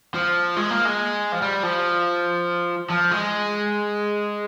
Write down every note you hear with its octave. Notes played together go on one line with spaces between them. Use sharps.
F3
G#3
A#3
G#3
F3
G3
F3
F3
G#3